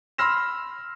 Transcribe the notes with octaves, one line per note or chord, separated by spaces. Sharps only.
B5 C6 E6 F6 A#6 E7